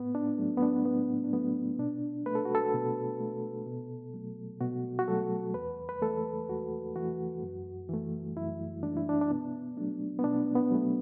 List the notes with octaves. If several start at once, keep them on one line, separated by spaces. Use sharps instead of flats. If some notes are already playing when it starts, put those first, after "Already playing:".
Already playing: A2 B3
D4
F#3 A3
B3
D4
A2 B3
D4
F#3 A3 B3
B2 D4
A3 B4
A4
F#4
A4
B2
A3
B2
F#3 A3
B2 F#4
F#4
F#3 A3 A4
E2 B4
B4
E3 A3 A4
E2 F#4
E3 A3 F#4
F#2
E3 A3
F#2 E4
E3 A3 D4
E4
D4
D4
B2 B3
F#3 A3 D4
B3
B2 D4
B3
F#3 A3